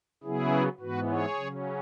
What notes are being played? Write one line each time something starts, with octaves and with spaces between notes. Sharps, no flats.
C#3 F#3 B3 E4 G#4
G#2 E3 B3 F#4 B4
G#4 C#5
C#3 F#3 C#4